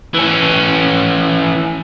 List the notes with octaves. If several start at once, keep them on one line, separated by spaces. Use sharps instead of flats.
E3 C#4